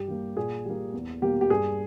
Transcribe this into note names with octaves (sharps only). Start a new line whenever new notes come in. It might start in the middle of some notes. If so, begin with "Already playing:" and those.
Already playing: G2 G4
G3 A#3
A#2 G#4
G3 A#3
E2
B2 G3 A#3 G4
G4
G2 G#4